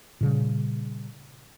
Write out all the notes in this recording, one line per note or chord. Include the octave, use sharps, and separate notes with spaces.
A#2 C#3 G3